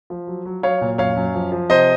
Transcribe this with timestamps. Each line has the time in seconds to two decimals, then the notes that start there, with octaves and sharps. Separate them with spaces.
0.10 F3
0.27 F#3
0.45 F#3
0.63 F#3 C#5 F5
0.81 A#2
0.98 F#2 C#5 F5
1.16 F#2
1.35 F3
1.52 F3
1.69 C3 C5 D#5